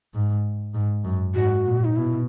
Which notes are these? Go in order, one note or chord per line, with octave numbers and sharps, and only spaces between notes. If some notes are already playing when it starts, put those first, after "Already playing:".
G#2
G#2
F#2
G#2 F#4
A#2
D#4
B2 E4